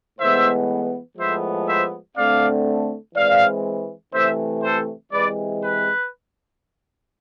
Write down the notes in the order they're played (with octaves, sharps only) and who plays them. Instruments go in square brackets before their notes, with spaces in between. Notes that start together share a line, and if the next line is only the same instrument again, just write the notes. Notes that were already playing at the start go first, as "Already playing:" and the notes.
[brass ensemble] A2 E3 G#3 B3 C5 E5
A2 F3 G#3 B3 C5 E5
C5 E5
D3 A3 C4 D5 F5
E3 G#3 C4 D5 F5
C3 E3 A3 C5 E5
A4 C5
C3 E3 G#3 B4 D5
B4